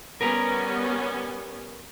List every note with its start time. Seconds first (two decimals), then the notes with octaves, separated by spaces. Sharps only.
0.21 G3 B3 C#4 A#4 B4 A#5